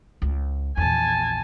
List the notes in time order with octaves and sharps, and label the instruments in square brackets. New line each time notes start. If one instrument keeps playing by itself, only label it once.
[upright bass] C#2
[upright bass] A#1 E2 [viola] G#5 A5